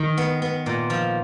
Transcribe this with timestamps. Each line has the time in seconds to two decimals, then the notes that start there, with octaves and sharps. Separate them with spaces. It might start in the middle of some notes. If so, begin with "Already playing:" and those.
Already playing: D#3
0.18 B3
0.42 B3
0.66 A#2
0.90 F3